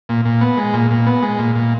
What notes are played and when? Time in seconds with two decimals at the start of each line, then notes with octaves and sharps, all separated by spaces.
0.09 A#2
0.25 A#2
0.41 B3
0.57 G#3
0.73 A#2
0.91 A#2
1.07 B3
1.22 G#3
1.39 A#2
1.55 A#2